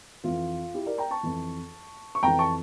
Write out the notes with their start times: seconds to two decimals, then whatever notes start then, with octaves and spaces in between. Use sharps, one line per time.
0.24 F2 E3 F4
0.74 E4 G4
0.86 A#4 D5
0.98 G5 A#5
1.11 A5 C#6
1.23 F2 E3
2.15 C#6
2.23 F2 E3 G5 A#5
2.39 A5 C#6